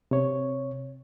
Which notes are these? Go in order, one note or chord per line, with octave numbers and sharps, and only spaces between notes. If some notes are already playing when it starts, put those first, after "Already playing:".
C3 C#5